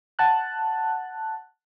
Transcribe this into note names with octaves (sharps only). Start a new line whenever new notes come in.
F#5 A5 F#6